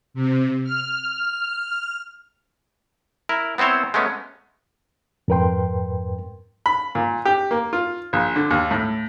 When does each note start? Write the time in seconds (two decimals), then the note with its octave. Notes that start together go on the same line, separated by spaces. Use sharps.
0.14 C3
0.64 F6
3.29 E4 A#4
3.58 B3 C4 E4 C5 C#5
3.94 G#3 A3 B3 C#4
5.28 F2 G#2 A#4 B4 G5 C6
6.66 B5
6.95 A#2
7.25 G4
7.51 A#3
7.73 F4
8.13 A#1
8.36 D3
8.51 D#2
8.71 A2